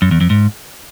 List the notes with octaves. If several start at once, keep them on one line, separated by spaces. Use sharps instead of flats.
F#2
E2
F2
G#2